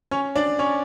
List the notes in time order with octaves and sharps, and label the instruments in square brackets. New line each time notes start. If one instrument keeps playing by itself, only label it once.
[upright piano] C#4 C#5
D4 D5
C#4 C#5